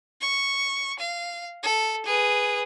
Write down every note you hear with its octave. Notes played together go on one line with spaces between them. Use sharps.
C#6
F5
A4
G#4 B4